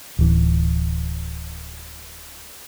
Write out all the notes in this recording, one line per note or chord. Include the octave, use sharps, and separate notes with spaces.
D1 E3